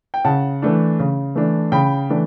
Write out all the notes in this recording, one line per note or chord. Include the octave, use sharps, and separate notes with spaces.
G5
C#3 F#5 A5
E3 A3 D4
C#3
E3 A3 D4
C#3 G5 B5
E3 A3 D4